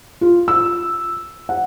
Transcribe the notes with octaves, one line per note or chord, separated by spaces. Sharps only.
F4
E6
F#5